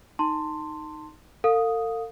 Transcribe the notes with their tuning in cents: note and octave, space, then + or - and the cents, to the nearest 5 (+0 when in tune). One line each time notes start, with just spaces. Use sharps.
D#4 +0 A5 +30 C6 +0
A4 +40 F5 +20 D#6 +0